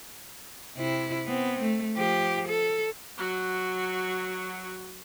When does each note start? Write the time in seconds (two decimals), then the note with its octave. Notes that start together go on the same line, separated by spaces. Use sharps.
0.77 C3 E4
1.27 B3 C4
1.62 A3
1.96 F3 G4
2.47 A4
3.18 F#3 F#4